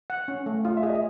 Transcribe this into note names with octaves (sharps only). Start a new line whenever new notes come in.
F#5
C#4
A3
F4 F5
E5
G#4
D#5